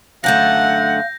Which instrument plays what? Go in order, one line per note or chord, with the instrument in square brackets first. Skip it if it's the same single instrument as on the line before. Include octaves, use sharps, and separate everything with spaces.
[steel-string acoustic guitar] F#2 D3 A3 [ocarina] F5 [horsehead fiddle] F#5 [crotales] G6 A#6